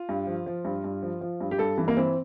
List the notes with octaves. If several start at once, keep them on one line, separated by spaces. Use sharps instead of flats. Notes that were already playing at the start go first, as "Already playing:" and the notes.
Already playing: F4
G2
F3
F3
G2
G2
F3
F3
G2
G4
G2 A4
E3
A#3
E3 C4